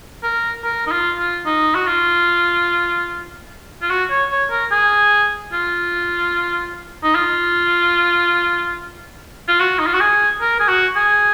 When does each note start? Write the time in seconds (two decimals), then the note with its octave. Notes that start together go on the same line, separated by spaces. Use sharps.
0.23 A#4
0.64 A#4
0.87 D#4
0.91 F4
1.18 F4
1.46 D#4
1.75 F#4
1.87 F4
3.82 F4
3.90 F#4
4.10 C#5
4.31 C#5
4.51 A#4
4.71 G#4
5.53 F4
7.04 D#4
7.15 F4
9.48 F4
9.60 F#4
9.79 D#4
9.86 F4
9.94 F#4
10.01 G#4
10.41 A#4
10.60 G#4
10.68 F#4
10.96 G#4